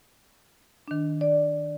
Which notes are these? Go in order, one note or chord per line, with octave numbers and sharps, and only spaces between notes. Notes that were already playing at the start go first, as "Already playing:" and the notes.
D#3 D4
D5